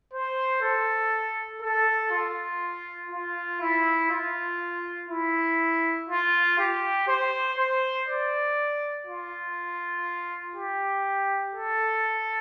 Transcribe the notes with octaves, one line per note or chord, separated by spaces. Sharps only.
C5
A4
A4
F4
F4
E4
F4
E4
F4
G4
C5
C5
D5
F4
G4
A4